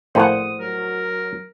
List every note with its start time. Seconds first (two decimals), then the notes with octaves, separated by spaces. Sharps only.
0.15 A#1 A2 A#3 C5 F#5 D#6
0.60 F#3 A#4